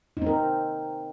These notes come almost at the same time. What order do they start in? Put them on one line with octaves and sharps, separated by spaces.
D#4 C4 A#4